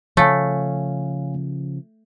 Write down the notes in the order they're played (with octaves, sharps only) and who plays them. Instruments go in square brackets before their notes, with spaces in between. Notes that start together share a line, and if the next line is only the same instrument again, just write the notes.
[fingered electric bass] C#3 F3 [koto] A3 [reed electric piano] C#5 F5 G#5